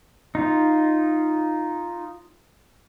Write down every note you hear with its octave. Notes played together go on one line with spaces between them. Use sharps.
D#4 F4